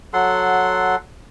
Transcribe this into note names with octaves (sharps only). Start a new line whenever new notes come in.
F#3 A4 F#5 C6